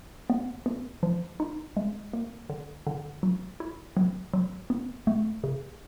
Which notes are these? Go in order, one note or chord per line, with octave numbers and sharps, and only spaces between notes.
B3
B3
F3
D#4
G#3
A#3
D3
D3
F#3
E4
F#3
F#3
B3
A3
C#3